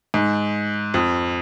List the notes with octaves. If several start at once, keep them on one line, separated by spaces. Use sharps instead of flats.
G#2
F2